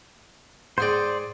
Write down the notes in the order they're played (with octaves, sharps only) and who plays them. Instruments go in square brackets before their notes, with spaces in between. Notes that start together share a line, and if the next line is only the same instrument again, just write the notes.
[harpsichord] G#2 G#4 G5 [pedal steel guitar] C5 D5